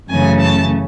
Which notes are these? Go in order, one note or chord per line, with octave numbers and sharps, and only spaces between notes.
F#2 C#3 E3 A3 C#4 G#5
A5